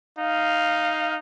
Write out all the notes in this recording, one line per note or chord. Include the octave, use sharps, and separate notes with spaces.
D#4 F5